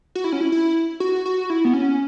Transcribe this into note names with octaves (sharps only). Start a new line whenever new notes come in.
F#4
E4
C#4
E4
E4
F#4
F#4
E4
B3
C#4